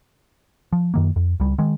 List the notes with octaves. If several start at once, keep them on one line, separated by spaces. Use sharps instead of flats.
F3
F#2 D#3 A#3
F2
C#2 G3
D#3 G#3